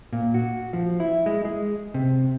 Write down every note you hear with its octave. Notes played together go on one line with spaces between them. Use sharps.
A#2
F#4
F3
E4
G#3
G#3
C3